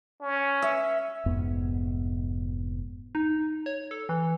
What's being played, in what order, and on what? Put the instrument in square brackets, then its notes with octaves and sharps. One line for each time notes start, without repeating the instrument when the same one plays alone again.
[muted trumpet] C#4
[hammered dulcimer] E5
[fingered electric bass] F1 F2 G#2 B3
[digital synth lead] D#4
C#5
A4
E3